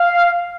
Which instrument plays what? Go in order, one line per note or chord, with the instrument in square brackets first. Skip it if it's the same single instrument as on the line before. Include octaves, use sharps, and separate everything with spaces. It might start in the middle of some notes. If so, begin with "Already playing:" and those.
Already playing: [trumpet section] F5